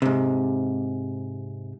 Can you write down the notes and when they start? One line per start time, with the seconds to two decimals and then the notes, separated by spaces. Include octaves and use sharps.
0.02 G#2 C3